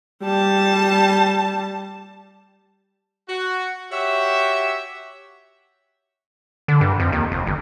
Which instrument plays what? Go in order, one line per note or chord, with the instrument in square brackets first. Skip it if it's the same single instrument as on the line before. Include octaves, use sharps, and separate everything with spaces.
[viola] G3 A5
[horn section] F#4
F#4 G4 C#5 E5
[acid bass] D3
G2
F2
D#2
F1
G1